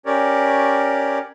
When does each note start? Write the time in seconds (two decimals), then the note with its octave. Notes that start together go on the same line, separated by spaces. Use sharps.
0.06 C#4 G4 A#4 C#5 D5